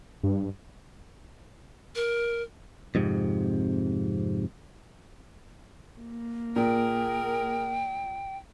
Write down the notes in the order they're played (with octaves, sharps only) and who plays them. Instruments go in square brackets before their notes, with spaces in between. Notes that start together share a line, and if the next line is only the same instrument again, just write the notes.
[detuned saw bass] G2
[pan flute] A#4
[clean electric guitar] F2 G#2 C3
[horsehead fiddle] A#3
[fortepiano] A#2 [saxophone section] G#4 A#4 [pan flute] G5